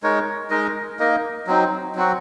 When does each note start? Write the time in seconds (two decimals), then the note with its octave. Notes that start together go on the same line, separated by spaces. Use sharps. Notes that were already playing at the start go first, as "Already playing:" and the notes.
0.03 G#3 D#4 A#4 C#5
0.50 G#3 D#4 A#4 D#5
0.99 A#3 D#4 A#4 D#5
1.47 F#3 C4 D#4
1.95 F#3 C4 F#4